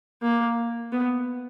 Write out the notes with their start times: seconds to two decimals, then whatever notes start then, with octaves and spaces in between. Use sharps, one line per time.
0.22 A#3
0.92 B3